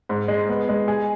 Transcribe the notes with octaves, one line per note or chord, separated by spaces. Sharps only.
G#2
G#3
B3
G#3
G#4